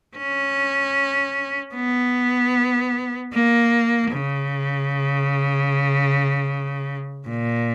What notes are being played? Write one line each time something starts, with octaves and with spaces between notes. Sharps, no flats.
C#4
B3
A#3
C#3
A#2